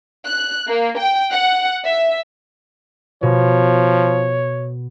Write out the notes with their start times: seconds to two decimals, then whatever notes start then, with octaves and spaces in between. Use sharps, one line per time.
0.24 F#6
0.68 A#3
0.98 G5
1.32 F#5
1.87 E5
3.23 B2 F3 C#5